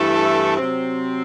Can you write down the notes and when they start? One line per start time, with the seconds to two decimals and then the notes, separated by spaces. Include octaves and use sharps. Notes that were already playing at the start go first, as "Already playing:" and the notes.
Already playing: G2 E3 A3 E4 A4
0.57 C3 F#3 C4